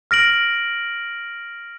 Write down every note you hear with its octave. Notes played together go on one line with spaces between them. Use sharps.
F6 A#6 D7 F#7